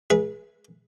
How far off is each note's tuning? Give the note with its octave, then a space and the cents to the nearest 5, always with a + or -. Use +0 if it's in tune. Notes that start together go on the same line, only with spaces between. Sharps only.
G#4 +0 B4 -35 E5 +0